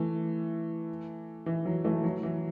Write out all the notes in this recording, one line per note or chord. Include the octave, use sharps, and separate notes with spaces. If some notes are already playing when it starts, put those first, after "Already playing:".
Already playing: E3 A3
E3
F#3
E3 A3
F#3
E3